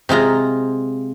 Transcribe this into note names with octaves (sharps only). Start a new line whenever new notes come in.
C3 G#3 F4 A#5